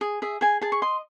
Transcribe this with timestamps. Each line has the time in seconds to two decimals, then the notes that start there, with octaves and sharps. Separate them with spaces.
0.01 G#4
0.22 G#4 E5
0.41 G#4 G#5
0.61 G#4 A5
0.72 C#6
0.82 D#5 C6